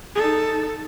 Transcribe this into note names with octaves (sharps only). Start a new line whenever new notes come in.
D#4 A4